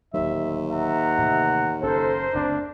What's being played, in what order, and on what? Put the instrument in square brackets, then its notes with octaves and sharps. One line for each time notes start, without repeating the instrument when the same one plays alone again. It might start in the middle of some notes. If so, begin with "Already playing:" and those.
[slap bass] D1 F#3 [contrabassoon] D#2 [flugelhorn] E5
[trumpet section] A#4 F#5 A#5 [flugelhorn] E5
[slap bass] A2 C3 E3
[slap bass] F#1 C#4 [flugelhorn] A4 [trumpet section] A#4 C5
[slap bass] F#1 D2 C4 [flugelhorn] D4